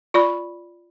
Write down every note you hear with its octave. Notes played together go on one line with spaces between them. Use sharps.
F4 D5 B5